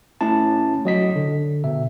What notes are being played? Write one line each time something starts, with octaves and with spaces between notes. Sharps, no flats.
A3 C#4 E4 A5
F#3 D#5 B6
D3
B2 E5